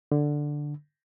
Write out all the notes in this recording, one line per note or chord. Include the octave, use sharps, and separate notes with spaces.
D3